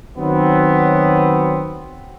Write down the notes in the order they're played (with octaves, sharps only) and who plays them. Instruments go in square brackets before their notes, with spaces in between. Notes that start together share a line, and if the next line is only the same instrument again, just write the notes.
[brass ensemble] D#3 F#3 B3 C4